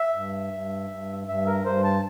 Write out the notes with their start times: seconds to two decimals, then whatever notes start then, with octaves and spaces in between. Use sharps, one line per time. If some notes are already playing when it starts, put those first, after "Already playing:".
Already playing: E5
0.14 G2
0.53 G2
0.91 G2
1.27 G2 E5
1.46 A#4
1.65 G2 C5
1.84 A5